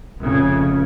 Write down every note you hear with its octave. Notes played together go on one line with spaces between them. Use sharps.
F1 C#3